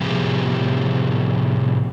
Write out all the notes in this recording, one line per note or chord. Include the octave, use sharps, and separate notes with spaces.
A2 C3 F3 B3 G4 G#4